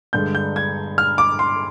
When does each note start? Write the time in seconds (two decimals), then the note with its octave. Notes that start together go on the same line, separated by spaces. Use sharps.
0.13 G2 D3 G#3 G6
0.35 G6
0.56 G#6
0.98 F6
1.18 D6
1.39 C6